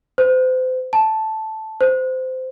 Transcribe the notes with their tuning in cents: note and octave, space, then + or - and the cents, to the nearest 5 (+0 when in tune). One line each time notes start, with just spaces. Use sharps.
C5 -35
A5 -5
C5 -20